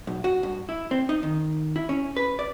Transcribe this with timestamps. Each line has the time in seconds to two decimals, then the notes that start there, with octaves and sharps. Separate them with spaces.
0.07 B1
0.24 F#4
0.43 G2
0.69 E4
0.91 C4
1.09 D#4
1.23 D#3
1.76 E4
1.89 C#4
2.17 B4
2.39 D5